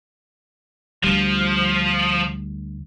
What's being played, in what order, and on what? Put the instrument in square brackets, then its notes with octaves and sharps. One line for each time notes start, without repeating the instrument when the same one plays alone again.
[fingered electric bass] D2 G3 [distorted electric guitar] F3